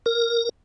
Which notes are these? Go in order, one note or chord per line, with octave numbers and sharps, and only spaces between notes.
A#4